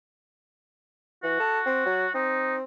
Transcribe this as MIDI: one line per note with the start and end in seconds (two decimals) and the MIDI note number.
1.23 1.39 52
1.23 2.14 66
1.39 1.59 69
1.66 1.83 60
1.86 2.07 54
2.14 2.63 60
2.14 2.55 63